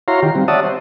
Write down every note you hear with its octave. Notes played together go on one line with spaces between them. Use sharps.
E4 F#4 C#5 F5 A#5 C6
D#3 F4 G4
G3 C4
C#5 D5 E5 F#5 A5 D#6
C5